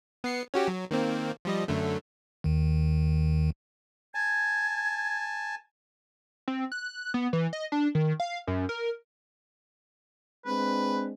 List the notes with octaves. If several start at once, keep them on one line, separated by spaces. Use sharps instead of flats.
B3 C7 C#7
C#4 F#4 G4
F#3
D#3 A#3 C4
F3 G3 D#5
F#2 D3 A3
D#2 D#3
G#5 A5 G#6
C4
F#6
B3
E3
D#5
D4
D#3
F5
F#2
A#4
G#3 C4 D4 B4